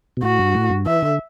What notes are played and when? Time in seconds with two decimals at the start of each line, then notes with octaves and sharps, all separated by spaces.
0.17 B2
0.23 A2 F#4
0.39 G2
0.55 A2
0.70 G2
0.86 E3 E5
1.02 D3